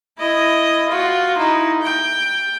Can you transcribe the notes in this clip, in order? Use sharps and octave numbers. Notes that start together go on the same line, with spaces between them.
E4 D#5
F4 F#4
D#4 E4
G5